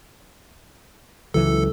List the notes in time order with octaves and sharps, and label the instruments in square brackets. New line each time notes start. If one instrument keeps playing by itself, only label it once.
[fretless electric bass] C#2 E3 F#3 [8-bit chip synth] A4